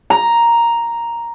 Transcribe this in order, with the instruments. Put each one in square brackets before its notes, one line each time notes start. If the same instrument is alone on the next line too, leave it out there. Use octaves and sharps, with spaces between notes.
[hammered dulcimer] A#5